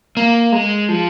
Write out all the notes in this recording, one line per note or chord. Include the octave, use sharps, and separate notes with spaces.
A#3
G#3
F3